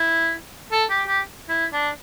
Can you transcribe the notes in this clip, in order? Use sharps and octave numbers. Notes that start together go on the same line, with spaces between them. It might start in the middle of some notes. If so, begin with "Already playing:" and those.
Already playing: E4
A4
G4
G4
E4
D4